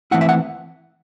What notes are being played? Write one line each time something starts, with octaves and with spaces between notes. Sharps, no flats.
E3 A3 C4 E4 F#5
E5
F#5